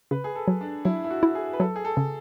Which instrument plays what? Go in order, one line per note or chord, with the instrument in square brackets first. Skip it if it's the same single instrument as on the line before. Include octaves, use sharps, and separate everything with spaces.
[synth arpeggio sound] C#3 [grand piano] B4
[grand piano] G#4
A4
[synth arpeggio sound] F#3
[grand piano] D4
[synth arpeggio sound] F#3 [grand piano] E4
[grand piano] E4
F#4
[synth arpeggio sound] E4
[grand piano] G#4
B4
[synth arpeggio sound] F#3 [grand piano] A4
[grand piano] G#4
A4
[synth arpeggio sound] C#3